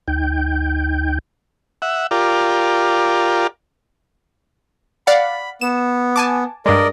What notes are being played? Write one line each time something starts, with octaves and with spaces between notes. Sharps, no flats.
D2 D#4 G5 G6
E5 F#5
F4 G4 A#4 D5
D5 F5 F#5 B5
B3 E7
G#5 A5 D6
G2 G#3 A#4 D5 D#5